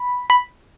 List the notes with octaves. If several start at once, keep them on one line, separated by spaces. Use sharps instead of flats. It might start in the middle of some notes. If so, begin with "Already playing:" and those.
Already playing: B5
B5